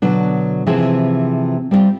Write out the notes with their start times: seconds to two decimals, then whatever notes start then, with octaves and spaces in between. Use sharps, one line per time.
0.02 B2 D3 F#3 D4
0.67 C3 E3 F3 C4 G#4
1.71 G3 C4 D4 F4 G4